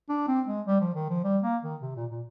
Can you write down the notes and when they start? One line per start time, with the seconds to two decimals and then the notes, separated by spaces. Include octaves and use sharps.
0.09 D4
0.27 C4
0.47 G#3
0.67 G3
0.81 F3
0.95 D#3
1.09 F3
1.24 G3
1.43 A#3
1.63 D#3
1.81 C3
1.96 A#2
2.11 A#2